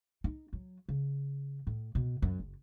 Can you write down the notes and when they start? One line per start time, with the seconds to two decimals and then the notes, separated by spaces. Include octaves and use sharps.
0.24 D#4
0.53 F#3
0.89 C#3
1.67 A2
1.95 B2
2.22 F#2
2.40 F#1